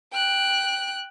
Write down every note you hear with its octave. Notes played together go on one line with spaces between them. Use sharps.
G5 F#6